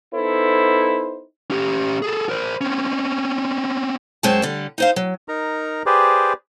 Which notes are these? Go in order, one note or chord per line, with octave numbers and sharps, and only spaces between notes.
B3 D#4 E4 A4 C5
C#4 G4
G#4 A4
A#4 C5
C4 C#4
F#2 G#3 C4 C#5 A5
D3 G3
D#4 C5 F5
F#3
D#4 A#4 A#5
G4 G#4 B4 C5 D5